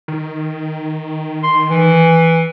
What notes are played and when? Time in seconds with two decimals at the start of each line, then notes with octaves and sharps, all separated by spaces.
0.08 D#3
1.43 C6
1.71 E3